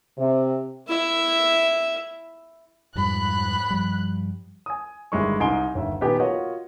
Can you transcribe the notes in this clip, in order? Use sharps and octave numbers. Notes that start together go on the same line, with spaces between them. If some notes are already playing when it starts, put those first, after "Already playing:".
C3
E4 E5
F2 G#2 G3 B5 F#6
G2 F3 G3
G#5 D#6
G1 D#3 G3 G#3 E4 C#6
C2 D#4 G#5 C6 D7 G7
G1 D#2 E5
D#1 B3 D#4 G4 G#5
A#3 F4 F#4 C#5 D#5 F#5